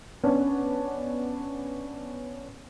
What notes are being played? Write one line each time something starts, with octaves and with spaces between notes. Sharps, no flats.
B3 C#4 D4